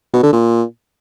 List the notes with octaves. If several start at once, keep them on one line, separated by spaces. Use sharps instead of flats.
B2
D3
A#2